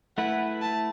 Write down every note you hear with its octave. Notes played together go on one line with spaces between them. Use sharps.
A3 E4 B4 F#5
A5